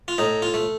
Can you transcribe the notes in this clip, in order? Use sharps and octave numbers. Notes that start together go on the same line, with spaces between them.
F4
A2 D#4
F4
A3